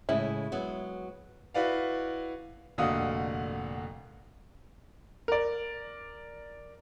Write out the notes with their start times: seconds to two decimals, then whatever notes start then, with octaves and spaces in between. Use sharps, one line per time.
0.09 A2 C#3 G#3 E4
0.52 F#3 G#3 B3
1.54 E4 F#4 B4 D5 F5
2.78 F1 A#2 D3 F#4 F5 D#6
5.28 A#4 D5